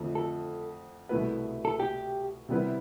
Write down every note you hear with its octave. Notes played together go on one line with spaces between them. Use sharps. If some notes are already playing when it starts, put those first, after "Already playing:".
Already playing: F2 D3 F3 A3
A4
C2 B2 A3 E4 B4
A4
G4
C3 G3 B3 E4 B4